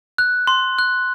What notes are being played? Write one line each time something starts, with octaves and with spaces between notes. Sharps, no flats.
F#6
C6
F#6